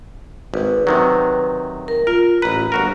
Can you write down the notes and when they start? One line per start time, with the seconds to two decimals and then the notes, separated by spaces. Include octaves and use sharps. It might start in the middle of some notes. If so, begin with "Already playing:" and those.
0.54 G#1 B4
0.87 C3 D#3 F#3
1.88 A#4
2.07 F4 A#4
2.42 A1 B4 A#5
2.72 G1 F#4 A#4